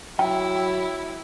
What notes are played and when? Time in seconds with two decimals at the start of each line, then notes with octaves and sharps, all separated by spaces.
0.19 F#3 E4 G5